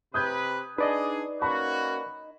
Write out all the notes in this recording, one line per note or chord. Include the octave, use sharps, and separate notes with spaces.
C3 B4 D#6 G6 G#6
D4 D#4 G#4 B4 D5 D#5
A#3 C#4 F#4 B5